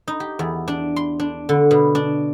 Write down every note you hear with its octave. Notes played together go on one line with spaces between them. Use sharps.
D#4
G4
E2
D4
C6
D4
D3
B2
D4